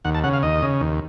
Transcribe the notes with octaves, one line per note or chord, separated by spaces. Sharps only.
D#2 F#5
A5
C#3 F#5
F5
D#2 D#5
C#3
D#2